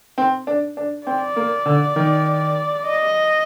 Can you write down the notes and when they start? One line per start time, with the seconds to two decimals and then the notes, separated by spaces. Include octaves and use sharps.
0.18 C4
0.47 D4
0.77 D4
1.07 C4 D5
1.36 A#3
1.66 D3
1.96 D#3
2.85 D#5